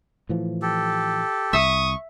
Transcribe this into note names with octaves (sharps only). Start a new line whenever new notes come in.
A2 E3 F3
G4 A4
C2 E5 C#6 D#6